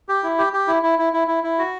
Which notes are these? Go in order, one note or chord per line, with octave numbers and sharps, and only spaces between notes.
G4
E4
G4
G4
E4
E4
E4
E4
E4
E4
F#4